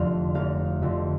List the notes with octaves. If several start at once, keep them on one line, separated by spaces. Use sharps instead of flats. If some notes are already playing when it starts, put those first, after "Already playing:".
Already playing: F1 F2 D3 F5
F1 F5
F2 D3